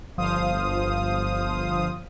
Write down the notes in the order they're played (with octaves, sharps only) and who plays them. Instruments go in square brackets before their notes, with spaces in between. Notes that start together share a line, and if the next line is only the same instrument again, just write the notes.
[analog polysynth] G1 F3 C5 F5 D#6